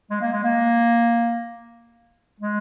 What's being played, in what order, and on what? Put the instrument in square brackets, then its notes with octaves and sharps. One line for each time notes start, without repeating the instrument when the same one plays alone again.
[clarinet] G#3
A#3
G#3
A#3
G#3